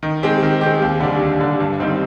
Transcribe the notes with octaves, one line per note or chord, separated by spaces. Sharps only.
D#3
G#3 C4 G4
D#3
G#3 C4 G4
D#2
D3 G3 D4
D#2
D3 G3 D4
G2
D#3 G3 C4 D#4